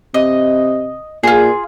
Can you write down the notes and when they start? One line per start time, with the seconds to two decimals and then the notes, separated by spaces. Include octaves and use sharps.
0.14 C3 D#5
1.23 A#2 F4 G#4